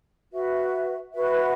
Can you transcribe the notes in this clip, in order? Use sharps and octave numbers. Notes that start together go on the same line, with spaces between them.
F#4 B4 E5
F#4 B4 E5